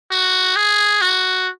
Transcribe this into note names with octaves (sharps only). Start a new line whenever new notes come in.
F#4
G#4
F#4